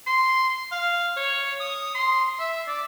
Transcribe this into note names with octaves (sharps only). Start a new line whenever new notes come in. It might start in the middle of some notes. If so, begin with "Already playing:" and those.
C6
F5
C#5
D#6
C6
E5
D5